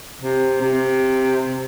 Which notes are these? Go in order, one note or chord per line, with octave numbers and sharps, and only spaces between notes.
C3
C3